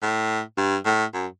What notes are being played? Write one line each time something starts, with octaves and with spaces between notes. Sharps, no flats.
A2
G2
A2
F#2